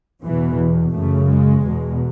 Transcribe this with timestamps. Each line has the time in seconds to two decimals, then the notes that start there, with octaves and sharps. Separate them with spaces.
0.23 E2 B2 E3
0.93 F#2 C#3 A3
1.28 G#3
1.63 E2 B2